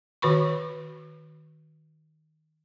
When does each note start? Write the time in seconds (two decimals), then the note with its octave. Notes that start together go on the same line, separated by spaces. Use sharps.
0.22 D#3 F#4 B4 B5 C#6